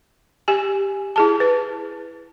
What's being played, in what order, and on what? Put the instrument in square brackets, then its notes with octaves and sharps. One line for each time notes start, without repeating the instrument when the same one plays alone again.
[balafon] G4 G#5
E4 G#4 A5
B4